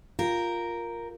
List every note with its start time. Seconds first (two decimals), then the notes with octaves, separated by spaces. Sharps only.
0.19 F4 G4 A#4